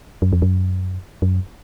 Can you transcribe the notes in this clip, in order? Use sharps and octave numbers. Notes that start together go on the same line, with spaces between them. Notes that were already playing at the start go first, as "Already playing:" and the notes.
F#2
F2
F#2
F#2